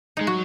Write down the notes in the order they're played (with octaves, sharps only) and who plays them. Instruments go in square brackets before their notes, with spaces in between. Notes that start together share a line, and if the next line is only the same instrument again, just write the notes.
[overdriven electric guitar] G#3 [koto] D#4
[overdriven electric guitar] F#3 [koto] F#4